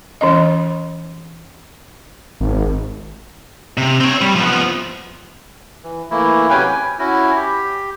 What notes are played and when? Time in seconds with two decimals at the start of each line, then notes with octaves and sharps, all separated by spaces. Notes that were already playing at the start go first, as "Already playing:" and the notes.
0.21 E3 C#4 D#5
2.41 G#1
3.77 C3
4.01 C4 C#5
4.21 G3
4.36 F3 B3
5.84 E3
6.11 E3 A3 A#3 E4
6.50 C3 F#3 C#4 B4 G5 G#5
6.67 G#5
6.99 C#4 E4 F#4
7.36 G4